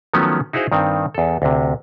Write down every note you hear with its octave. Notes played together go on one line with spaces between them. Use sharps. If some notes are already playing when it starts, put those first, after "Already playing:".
D#3 F3 F#3 A3 B3 C#4
D#4 E4 F#4 G#4 C5 F5
G2 D#3 C4
E2 A4
D2 C3